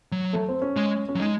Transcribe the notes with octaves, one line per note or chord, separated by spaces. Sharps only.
F#3
A3
C4
C#4
G#3
C#4
F#3
G#3 D#4